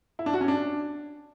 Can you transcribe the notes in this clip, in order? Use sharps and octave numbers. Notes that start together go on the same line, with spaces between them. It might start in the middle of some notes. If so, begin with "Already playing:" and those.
E4
D4
F#4
C#4
D4